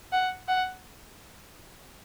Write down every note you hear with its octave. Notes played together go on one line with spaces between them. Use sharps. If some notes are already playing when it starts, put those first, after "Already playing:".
F#5
F#5